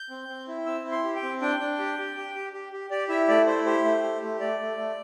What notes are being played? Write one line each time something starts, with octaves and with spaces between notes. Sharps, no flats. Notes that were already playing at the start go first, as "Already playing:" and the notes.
Already playing: G6
C4
C4
E4
C4 E6
E4
C6
G4
G5
C4
D4 G5
D4
G4
G4
G4
G4
G4
G4
G4 D5
E4 E5
A3 D5
E4 C5
G4 C5
A3
G4
A3
A3 D5
A3
A3